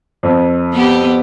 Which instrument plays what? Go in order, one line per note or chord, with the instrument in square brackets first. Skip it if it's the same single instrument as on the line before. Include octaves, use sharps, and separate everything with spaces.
[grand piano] F2
[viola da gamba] B3 G4